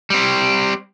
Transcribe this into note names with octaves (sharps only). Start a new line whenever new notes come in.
G3 C4